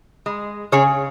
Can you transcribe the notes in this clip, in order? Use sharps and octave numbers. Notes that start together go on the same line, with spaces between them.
G#3
C#3 G#4 C#5